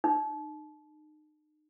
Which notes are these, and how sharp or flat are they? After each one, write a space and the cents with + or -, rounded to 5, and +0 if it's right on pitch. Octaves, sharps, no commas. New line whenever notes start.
D#4 -35